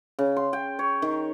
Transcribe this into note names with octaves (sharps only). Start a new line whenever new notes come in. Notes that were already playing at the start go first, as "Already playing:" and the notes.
C#3
C6
G5
C#5
D#3